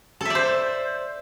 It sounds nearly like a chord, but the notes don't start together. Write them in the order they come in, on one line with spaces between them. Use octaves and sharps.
A4 E5 D5 C5